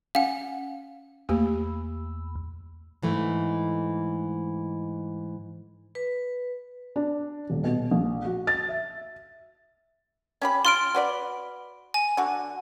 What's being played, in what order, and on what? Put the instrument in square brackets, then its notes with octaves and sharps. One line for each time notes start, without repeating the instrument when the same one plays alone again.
[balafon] C#4 G#5 [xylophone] F5 F#5
[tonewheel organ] E2 [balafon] A3 A#3 G4
[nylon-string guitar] G#2 E3 A3
[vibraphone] B4
[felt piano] D4
D#1
B2
A#1
F#4
A6
E5
[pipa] C#4 G4 B5
[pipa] F4 [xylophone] C6 F6 D7
[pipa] F#4 B4 D5
[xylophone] G#5
[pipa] D3 F#4